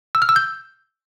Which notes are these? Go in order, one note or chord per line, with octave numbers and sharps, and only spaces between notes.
E6
F6
E6
G6